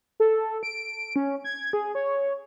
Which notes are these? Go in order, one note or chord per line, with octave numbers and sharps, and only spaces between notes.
A4
D7
C#4
G#6
G#4
C#5